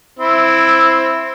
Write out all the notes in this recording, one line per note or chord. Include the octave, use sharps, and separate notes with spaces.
C4 E4